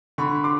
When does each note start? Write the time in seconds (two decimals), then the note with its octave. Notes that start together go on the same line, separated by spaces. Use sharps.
0.18 D3 B5 C#6
0.44 C6 D6